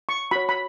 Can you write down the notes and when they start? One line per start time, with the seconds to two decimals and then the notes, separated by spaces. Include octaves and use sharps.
0.09 C#6
0.31 F#4 C#5 B5
0.49 B5